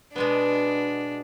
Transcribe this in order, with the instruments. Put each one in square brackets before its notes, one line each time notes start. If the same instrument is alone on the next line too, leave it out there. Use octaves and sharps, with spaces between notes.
[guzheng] B2 G#3 B3 [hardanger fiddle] D4